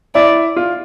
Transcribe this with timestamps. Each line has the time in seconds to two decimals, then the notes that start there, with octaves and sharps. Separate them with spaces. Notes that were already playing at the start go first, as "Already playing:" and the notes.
0.15 E4 D5
0.56 F4